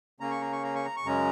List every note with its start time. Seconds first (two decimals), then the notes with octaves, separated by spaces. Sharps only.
0.20 C#3 A#3 C#4 A#5
0.31 C#6
0.41 A#5
0.52 C#6
0.64 A#5
0.75 C#6
0.85 A#5
0.96 C#6
1.03 F#2 C#3 G#3 C#4 A#5